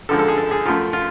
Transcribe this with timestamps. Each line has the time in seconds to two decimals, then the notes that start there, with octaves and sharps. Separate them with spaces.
0.09 F#2 D3 F3 G#3 A4
0.19 A4
0.28 G#4
0.38 A4
0.51 G#4
0.66 F#2 F3 A3 F4
0.93 F4